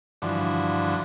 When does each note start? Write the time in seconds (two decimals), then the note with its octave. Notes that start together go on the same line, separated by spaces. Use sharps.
0.22 G2 D3 E3 F3 F#4